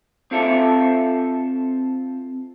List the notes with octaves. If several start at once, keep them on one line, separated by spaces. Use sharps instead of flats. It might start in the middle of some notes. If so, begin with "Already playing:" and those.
C4 F4 A4 E5